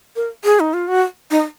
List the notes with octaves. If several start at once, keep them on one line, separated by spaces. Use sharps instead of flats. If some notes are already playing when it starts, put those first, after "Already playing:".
A#4
G#4
D#4
F4
F#4
D#4